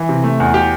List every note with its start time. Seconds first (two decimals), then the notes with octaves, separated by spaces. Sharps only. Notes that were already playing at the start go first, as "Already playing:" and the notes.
Already playing: E3
0.09 C3
0.24 A3
0.40 E2
0.54 G4